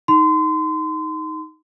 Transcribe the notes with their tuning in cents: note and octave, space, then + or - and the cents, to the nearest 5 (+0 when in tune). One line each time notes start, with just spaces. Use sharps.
D#4 +10 C6 -30